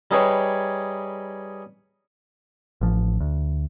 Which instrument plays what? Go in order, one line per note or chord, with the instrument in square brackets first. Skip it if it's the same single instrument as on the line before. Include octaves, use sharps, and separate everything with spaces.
[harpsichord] G3 D#4 G#4 B4 C#5 G5
[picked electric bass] A1 F3
D2